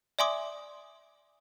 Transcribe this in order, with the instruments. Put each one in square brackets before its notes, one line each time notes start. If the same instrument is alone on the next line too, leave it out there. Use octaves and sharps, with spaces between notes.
[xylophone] D5 E5 G#5 C6 D6 D#6